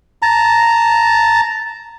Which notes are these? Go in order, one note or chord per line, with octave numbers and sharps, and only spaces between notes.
A5 A#5